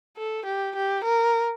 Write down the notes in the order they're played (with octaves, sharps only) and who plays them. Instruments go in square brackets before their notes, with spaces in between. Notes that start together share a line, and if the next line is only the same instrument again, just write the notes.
[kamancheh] A4
G4
G4
A#4